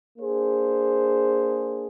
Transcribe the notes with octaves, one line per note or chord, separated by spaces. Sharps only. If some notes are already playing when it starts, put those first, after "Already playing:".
A#3 D4 G#4 C5